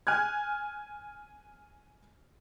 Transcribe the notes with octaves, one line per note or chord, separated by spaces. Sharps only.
G#5 F6 F#6 G#6